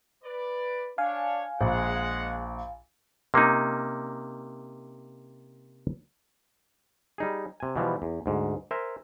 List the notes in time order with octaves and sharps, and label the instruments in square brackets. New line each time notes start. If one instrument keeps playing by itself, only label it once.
[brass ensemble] B4 D5
[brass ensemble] D4 C#5 [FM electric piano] F5 G#5
[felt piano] A#1 [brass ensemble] G#3 F#5
[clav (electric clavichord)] C3 A#3 C#4 D#4
G3 D#4 G#4
C3 G#5
B2 E3 F3 G3
E2
D2 G#2
A#4 C5 E5 G#5